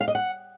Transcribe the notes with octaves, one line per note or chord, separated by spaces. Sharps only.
F5
D#5
F#5